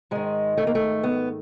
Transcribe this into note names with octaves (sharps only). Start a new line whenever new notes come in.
G#2 D#3 G#3
A3
A#3
A3
B3